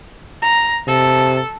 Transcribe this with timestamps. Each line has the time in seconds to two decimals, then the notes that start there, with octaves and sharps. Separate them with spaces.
0.42 A#5
0.88 C3 A4